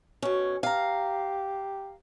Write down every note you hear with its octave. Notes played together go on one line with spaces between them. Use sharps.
B2 C#4
G4 F5 A#5